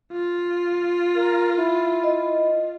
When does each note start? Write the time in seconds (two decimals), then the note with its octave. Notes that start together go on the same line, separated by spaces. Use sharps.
0.12 F4
1.15 A#4
1.57 E4
2.04 D#5